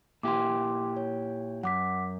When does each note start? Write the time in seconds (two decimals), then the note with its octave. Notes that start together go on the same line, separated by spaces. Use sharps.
0.23 A#2 E4 G4 C6 D6
0.96 C#5
1.63 F#2 F#5 D6 B6